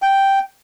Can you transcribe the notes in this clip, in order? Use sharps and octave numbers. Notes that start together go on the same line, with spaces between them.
G5